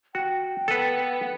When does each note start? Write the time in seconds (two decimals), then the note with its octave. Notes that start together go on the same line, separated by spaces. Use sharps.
0.15 F#4 G5
0.68 B3 A4 B4